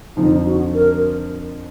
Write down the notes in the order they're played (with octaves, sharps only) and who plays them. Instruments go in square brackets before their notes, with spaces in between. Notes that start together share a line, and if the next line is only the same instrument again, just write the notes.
[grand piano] F2 D3 F3 [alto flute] D#4
[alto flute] F#4
A#4